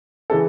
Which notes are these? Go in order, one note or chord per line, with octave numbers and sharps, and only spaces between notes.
C#3 E3 A4